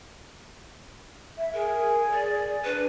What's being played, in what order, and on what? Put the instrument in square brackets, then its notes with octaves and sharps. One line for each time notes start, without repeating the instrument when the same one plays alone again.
[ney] E5
[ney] G#4 [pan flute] A#4
[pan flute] D5
[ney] D4 [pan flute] B4